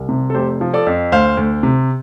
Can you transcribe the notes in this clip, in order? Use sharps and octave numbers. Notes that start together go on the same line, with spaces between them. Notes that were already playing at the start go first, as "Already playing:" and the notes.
Already playing: C2
C3
A4
F1 G4 C5
F3
A4 D5
F2
D2 C5 F5
D2
C3